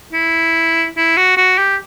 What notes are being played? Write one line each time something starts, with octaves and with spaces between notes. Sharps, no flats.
E4
E4
F#4
F#4
G4